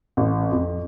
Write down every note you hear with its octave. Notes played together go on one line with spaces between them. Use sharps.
A1
F2